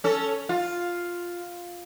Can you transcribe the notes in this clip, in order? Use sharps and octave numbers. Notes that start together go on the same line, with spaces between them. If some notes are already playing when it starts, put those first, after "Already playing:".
C#4 A4
F4